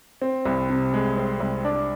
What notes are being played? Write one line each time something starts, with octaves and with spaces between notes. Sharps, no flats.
C4
C2
C3
G#3
C4
C2
D4